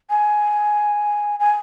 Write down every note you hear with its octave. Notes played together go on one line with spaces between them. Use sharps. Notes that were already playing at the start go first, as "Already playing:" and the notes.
G#5
G#5